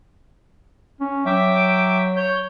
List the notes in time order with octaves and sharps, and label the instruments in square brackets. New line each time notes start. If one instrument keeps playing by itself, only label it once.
[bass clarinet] C#4
[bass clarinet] F#3 [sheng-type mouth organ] E5 G5 D6
[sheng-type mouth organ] C#5 G6